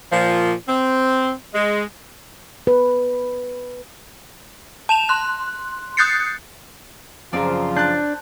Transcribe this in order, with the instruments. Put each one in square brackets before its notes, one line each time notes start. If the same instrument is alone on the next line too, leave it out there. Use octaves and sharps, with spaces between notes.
[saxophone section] A#2 F3
C4
G#3
[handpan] B4
[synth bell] A5 E7 F7
C6 F#6
D#6 F#6 G6 A6 C7 C#7
[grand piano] F#2 C#3 A#5 [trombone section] F3 F4 [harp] C4 D5
[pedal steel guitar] D4 [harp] A5 F#6 G6